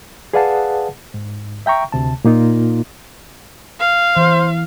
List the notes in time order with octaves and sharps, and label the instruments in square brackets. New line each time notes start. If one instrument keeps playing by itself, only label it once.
[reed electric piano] G#4 B4 D5 F5 F#5 A5
G#2
E5 G5 A#5 C#6
D2 C3 A5
A#2 A#3 D#4 F4
[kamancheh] F5
[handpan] E3 [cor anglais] C5